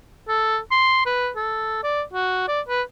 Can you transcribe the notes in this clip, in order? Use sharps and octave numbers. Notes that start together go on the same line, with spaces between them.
A4
C6
B4
A4
D5
F#4
D5
B4